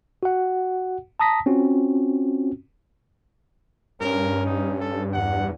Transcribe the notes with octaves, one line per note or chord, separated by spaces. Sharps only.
F#4 F#5
A5 A#5 D#6 A#6 B6
C4 C#4 F4 F#4
G2 C#4 A#4
D#4
A4
E2 F#5